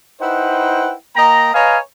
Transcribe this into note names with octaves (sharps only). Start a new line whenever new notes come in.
D#4 E4 B4 C5 F#5 G5
A#3 D#5 G5 A#5
B4 C#5 D#5 F5 G#5 A#5